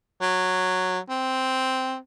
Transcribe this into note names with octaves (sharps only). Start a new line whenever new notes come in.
F#3
C4